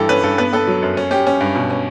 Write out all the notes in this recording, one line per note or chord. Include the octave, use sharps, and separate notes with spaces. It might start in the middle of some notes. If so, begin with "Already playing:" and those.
Already playing: G2 E3 G4 A4
C#4 B4
G2 A4
B3 B4
B3 A4
F#3
F#2
C#4
C#4 G4
C#4
G2
B2
C#4